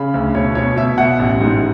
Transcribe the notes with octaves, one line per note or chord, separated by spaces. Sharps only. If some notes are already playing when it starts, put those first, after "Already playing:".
Already playing: C#3 B5
D2
B2 C#5
B2 C#5
B2 E5
B2 F#5
A1
G#2